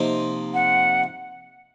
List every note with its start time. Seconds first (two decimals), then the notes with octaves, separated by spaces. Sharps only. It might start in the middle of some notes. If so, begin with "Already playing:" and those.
Already playing: C3 F3 A#3 D#4
0.54 F#5